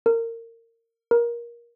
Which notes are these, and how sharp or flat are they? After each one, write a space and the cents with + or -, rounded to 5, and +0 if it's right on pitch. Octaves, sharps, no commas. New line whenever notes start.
A#4 -25
A#4 +20